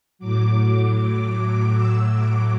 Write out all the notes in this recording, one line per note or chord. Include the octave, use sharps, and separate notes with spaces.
A2 F#3 D6
E6
D6